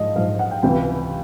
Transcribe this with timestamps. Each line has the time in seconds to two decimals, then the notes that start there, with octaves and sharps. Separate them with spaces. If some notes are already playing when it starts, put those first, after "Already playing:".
Already playing: G#2 F3 D#5
0.16 G#2 F3 F5
0.39 F#5
0.51 G5
0.63 C#2 C3 E3 G5